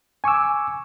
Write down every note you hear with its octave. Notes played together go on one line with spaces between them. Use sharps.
G#5 C#6 D6 E6